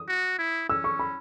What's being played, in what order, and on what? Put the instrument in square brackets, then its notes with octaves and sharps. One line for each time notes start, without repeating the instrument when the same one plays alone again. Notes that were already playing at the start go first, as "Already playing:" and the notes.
Already playing: [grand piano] D#6
[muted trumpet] F#4
E4
[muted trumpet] C#4 [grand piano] E6
[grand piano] C#6
B5